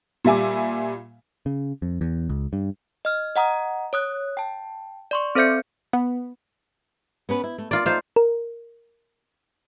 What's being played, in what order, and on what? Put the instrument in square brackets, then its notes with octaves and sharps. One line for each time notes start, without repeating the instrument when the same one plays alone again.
[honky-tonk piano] A#2 G3 E5 G#5 D6
[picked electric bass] C#3
F2
E2
C#2
G2
[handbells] D#5 F6
D#5 F#5 A#5 D#6
C#5 D#6 F#6
G5 A5
D5 C6 C#6
C4 A4 C5 E5 G6 C#7
[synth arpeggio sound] B3
[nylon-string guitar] B3 C#4 B4
E4
A3
[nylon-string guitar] A#3 [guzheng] F4 D5
[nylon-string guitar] A3 D#4 [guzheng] F4 C5
[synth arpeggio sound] A#4